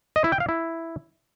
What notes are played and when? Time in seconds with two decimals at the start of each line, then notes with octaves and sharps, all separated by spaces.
0.16 D#5
0.24 E4
0.32 G5
0.40 F5
0.49 E4